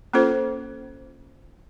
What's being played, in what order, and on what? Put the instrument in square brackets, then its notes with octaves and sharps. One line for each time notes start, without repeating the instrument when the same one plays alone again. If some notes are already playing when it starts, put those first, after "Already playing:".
[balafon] A#3 C#4 F4 A4 C5